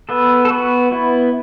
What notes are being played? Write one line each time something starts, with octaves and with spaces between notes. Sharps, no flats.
B3 A4
A4
B3 F#4
B3 E4